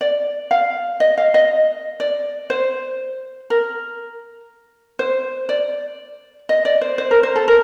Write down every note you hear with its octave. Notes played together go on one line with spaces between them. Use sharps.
D5
F5
D#5
F5
D#5
D5
C5
A#4
C5
D5
D#5
D5
C5
C5
A#4
C5
A4
A#4